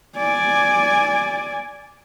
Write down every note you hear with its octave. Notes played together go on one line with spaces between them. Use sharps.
D5 G#5